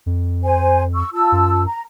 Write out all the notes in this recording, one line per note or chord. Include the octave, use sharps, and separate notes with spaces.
F2
C5 G#5
C#6 E6
F4 A5 E6
F#2
A#5